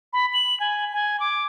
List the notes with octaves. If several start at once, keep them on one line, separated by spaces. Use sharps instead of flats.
B5
F#7
G#5
G#5
D6